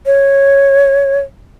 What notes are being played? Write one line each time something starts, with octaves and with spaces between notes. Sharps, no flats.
C#5